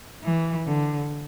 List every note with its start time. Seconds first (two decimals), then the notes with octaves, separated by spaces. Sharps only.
0.24 E3
0.66 D3